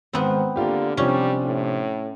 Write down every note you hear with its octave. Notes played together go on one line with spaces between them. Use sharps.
G#2 D#3 B3 C4 C5
D3 A#3 F4 G4
C3 F3 G3 C#4 D4
A2